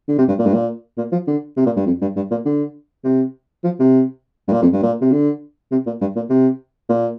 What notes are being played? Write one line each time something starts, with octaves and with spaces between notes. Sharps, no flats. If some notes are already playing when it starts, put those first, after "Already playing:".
D3
C3
G2
A#2
G2
A#2
A#2
F3
D3
C3
A#2
G2
F2
G2
G2
A#2
D3
C3
F3
C3
G2
A#2
F2
G2
A#2
C3
D3
C3
A#2
G2
A#2
C3
A#2